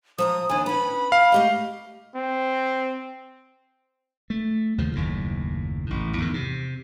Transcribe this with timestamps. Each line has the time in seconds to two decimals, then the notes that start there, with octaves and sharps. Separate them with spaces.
0.18 F3 A5 A#5 D#6
0.49 D#2 D4 G#5
0.66 B3 C#4 B5
1.12 F5
1.32 A3 G4 D#5
2.15 C4
4.30 A3
4.78 D#2 C#3 F3
4.95 F#1 D#2 A2
5.86 A1 A2
6.18 E2 G#2 D#3
6.34 C3